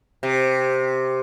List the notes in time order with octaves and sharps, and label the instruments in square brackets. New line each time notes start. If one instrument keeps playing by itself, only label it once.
[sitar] C3